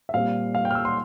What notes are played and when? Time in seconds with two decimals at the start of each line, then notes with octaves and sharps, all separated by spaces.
0.09 E5
0.14 A#2 G3 C4 F5
0.55 F5
0.65 G5
0.71 F6
0.75 E6
0.85 C6